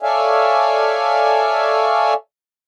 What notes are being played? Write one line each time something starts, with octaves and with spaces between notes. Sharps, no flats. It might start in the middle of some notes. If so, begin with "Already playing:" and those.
A4 C#5 D5 E5 F5 G#5